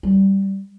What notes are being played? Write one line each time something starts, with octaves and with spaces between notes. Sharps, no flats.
G3